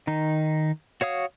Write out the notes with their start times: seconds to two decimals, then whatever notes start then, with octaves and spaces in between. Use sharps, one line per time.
0.07 D#3 D#4
1.01 F#4 C#5 F5 D#6